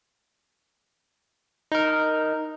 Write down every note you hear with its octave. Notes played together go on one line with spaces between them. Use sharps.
D#4 A#4